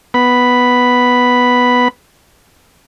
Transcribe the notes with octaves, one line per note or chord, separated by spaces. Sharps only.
B3 B5